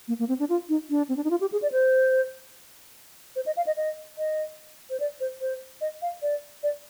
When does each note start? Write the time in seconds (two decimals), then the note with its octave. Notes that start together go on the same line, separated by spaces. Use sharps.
0.08 A#3
0.19 A#3
0.28 C4
0.40 D4
0.49 F4
0.69 D#4
0.90 D4
1.09 C4
1.17 D4
1.24 D#4
1.31 F4
1.41 G4
1.52 G#4
1.62 D5
1.72 C5
3.36 C5
3.46 D#5
3.57 F5
3.67 D#5
3.77 D#5
4.18 D#5
4.90 C5
5.00 D5
5.20 C5
5.41 C5
5.81 D#5
6.02 F5
6.22 D5
6.63 D5